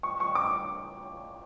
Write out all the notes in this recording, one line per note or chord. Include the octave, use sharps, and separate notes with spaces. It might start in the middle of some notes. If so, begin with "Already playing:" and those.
C#6
C#6
D6